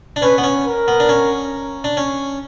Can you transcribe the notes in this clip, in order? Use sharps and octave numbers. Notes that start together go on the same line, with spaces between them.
D4
C#4 B4
B3
C#4
A#4
B3
D4
C#4
D4
C#4